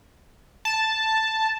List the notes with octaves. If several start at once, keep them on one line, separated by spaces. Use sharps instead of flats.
A5